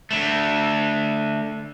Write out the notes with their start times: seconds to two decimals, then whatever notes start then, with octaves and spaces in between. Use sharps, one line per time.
0.11 D3 A3